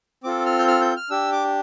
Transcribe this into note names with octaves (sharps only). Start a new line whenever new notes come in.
C4 F4 A4 D6
F6
G6
F6
G6
F6
D4 G4 E6
D6